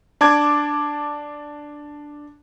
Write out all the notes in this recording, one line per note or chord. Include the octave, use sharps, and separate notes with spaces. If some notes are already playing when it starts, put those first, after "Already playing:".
D4 A5 D6 G#6